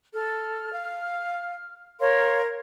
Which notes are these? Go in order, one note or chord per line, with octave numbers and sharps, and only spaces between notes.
A4 F6
F5
A#4 C#5 F5 C6